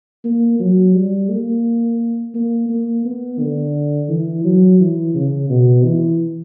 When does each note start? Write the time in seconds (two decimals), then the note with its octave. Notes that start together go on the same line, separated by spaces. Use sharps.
0.24 A#3
0.59 F#3
0.94 G3
1.29 A#3
2.35 A#3
2.69 A#3
3.05 B3
3.40 D3
4.09 E3
4.44 F#3
4.79 E3
5.14 C#3
5.49 B2
5.84 E3